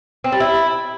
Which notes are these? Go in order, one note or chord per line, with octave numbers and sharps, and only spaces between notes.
C4
G3
E4